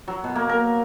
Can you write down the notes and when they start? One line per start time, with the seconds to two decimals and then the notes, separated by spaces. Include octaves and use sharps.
0.08 F#3
0.24 B2
0.36 A#3
0.49 A#4